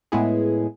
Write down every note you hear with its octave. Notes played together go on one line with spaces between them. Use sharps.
A2 G#3 B3 E4 G#4